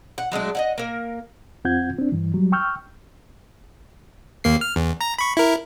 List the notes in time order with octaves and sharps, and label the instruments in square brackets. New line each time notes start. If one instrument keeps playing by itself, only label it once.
[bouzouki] F#5
F#3 G#3 A3 D4
D#5 E5 F#5
A#3 A#4
[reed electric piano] F2 C4 F4 F#5 G6 G#6
C4 D4
G2 E3
F#3 G3
G5 C#6 E6 F6 G6
[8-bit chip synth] D#2 A#3 C7
F6
E2
A#5 A#6
B5 C#6
E4 A#4